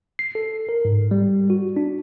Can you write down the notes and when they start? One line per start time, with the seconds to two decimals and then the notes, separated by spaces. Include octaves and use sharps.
0.19 C7
0.35 A4
0.69 A#4
0.85 G#2
1.11 G3
1.50 F#4
1.77 D4